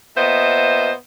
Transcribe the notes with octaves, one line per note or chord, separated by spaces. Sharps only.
A#2 B3 C5 D#5 E5